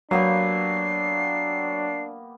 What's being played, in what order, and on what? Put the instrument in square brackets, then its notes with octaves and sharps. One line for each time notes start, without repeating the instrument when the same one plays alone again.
[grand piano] F#3 [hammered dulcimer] A#3 B3 G4 [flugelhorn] D4 [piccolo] C7